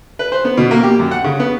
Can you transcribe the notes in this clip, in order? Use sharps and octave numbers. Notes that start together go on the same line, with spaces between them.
B4
C5
B3
B2
A#3
G4
F#2
F#5
C#3
B3